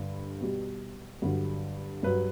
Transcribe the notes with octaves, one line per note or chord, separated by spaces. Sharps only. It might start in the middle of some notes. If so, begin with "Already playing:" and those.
Already playing: G2 D3
B2 G3
G2 D3 F#3
G2 F#3 B4